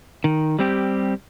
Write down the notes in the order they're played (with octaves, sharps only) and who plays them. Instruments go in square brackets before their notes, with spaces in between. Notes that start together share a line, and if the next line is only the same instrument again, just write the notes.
[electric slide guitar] D#3
G3 C4 G4